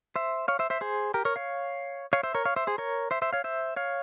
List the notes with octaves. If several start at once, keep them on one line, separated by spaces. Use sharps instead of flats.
C5 E5
C#5 F5
C5 E5
C5 E5
G#4 C5
G4 A#4
A#4 C#5
C#5 F5
C#5 F5
C5 E5
A#4 C#5
C#5 F5
C5 E5
G#4 C5
A#4 C#5
C5 E5
C5 E5
C#5 F5
C5 E5
C#5 F5